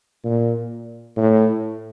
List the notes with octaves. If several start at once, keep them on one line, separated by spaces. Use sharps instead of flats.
A#2
A2